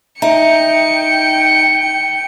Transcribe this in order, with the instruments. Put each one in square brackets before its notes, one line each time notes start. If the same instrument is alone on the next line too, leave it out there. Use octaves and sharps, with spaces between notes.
[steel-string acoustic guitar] D#4 [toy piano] E5 A#5 [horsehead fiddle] G5 [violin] C#7